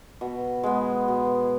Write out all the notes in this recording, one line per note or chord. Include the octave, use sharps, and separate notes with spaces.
B2
G#3 B3
B2